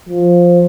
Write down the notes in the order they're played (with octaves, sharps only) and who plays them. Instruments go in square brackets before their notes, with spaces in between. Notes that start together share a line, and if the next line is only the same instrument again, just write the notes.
[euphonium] F3